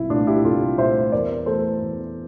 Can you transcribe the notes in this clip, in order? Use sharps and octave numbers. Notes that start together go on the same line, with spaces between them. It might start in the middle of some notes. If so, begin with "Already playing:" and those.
Already playing: C2 E4
A#2 A3 D4 F4
E4 G4
C2 F4 A4
A#2 A3 C5 E5
E2 A#4 D5
E3 A3 A4 C5
E2